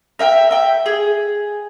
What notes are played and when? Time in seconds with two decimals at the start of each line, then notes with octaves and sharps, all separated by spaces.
0.19 A#4 E5 G5
0.51 E5 G5
0.86 G#4